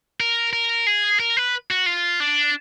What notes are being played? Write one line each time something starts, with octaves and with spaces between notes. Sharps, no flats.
A#4
A#4
G#4
A#4
B4
F#4
F4
D4